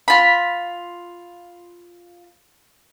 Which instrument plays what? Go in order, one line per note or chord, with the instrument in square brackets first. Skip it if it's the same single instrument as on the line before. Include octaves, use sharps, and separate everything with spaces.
[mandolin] F4 B5